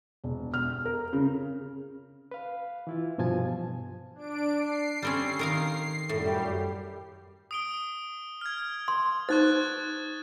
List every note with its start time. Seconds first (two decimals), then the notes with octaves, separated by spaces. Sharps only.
0.24 E1
0.54 F6
0.85 A#4
1.13 C#3
2.31 B4 F5
2.87 E3 E4 F4
3.18 G2 B2 F3 G#5 A5 G#6
4.15 D4 D7
4.58 C7
5.02 G3 C4 C#4
5.39 D#3 A#4 F5
6.09 F#2 A2 G3 G4
7.51 D#6 D7 G7
8.41 F6 G#6
8.88 C6
9.29 D#4 C5 C#6 F#6 A6